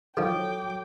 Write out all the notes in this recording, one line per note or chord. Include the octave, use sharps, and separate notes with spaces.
D#3 F3 F#3 A4 G5 D6